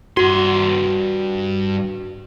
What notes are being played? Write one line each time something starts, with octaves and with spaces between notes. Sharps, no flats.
G2 F#4 C6